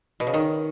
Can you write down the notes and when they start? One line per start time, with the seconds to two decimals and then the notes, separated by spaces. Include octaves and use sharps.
0.20 B2
0.27 C#3
0.34 D#3